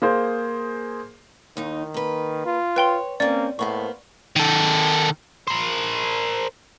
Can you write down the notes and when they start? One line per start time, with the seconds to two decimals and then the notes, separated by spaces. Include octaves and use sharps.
0.02 A#3 G#4 C5
1.57 D#2 D#3 D#4
1.94 A#3 B4
2.46 F4
2.76 B4 C#5 G5 C6
3.20 A#3 C4 C#4 D5
3.59 A2 A#3 B3 C5 C#6
4.36 D#3 A4
5.47 A#4 C5